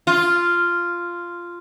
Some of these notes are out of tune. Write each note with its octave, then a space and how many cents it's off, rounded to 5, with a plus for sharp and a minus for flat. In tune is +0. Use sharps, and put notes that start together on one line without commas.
F4 -5